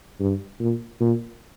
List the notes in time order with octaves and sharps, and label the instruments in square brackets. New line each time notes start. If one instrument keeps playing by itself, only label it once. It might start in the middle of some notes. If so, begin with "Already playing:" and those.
[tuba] G2
A#2
A#2